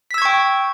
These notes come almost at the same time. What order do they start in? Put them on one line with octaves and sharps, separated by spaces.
B6 E6 G#6 C#6 G5